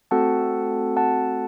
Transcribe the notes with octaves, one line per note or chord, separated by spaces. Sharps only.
A3 C4 F#4 A4 F#5 A5
F#5 A5